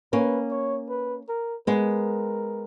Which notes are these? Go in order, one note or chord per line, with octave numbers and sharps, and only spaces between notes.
A#3 C#4 B4
C#5
B4
A#4
G#3 B3 A#4